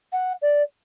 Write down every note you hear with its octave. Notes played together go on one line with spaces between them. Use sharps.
F#5
D5